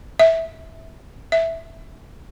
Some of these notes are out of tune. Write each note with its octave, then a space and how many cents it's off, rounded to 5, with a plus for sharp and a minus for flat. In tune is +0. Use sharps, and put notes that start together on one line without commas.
E5 -10
E5 +0